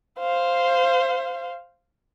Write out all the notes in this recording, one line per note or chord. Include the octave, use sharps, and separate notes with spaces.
C5 F5